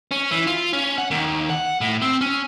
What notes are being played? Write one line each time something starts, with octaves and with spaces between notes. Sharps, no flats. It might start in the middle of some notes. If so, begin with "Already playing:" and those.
C#4
E3
F4
C#4
F#5
D#2
F#5
A2
C4
C#4